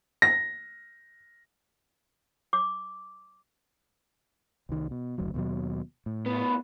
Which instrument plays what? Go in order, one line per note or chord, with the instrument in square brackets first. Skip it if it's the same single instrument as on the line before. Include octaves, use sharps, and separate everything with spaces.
[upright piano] A#6
[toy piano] D6
[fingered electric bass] C2 D#3
B2
F#1 D2 F#3
D#2 B2 F#3
A2
[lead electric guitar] D2 B3